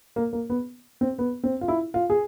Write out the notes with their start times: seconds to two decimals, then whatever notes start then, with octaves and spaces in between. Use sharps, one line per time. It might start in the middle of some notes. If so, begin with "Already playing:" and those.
0.16 A#3
0.33 A#3
0.50 B3
1.01 C4
1.19 B3
1.44 C4
1.61 F4
1.68 E4
1.94 F4
2.10 G#4